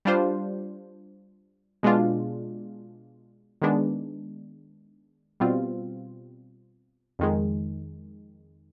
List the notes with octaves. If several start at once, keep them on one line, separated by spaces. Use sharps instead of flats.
G3 D4 F4 C5
B2 G#3 D4 F4
D#3 G#3 B3 D4
B2 G3 C4 F4
F2 D#3 G#3